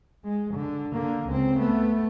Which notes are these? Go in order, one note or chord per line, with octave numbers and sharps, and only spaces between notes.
G#3
D3
D3 A#3
C#2 C4
A3 B3